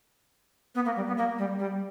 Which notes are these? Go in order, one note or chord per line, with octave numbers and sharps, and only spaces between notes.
B3
A#3
G3
B3
A#3
G3
G3